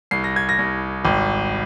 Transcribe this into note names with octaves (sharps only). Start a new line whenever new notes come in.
C2 C7
A#6
G#6
A#6
C2
G#1